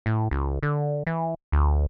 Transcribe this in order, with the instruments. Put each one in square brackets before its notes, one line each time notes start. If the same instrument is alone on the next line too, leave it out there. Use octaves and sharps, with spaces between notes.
[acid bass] A2
C#2
D3
E3
D2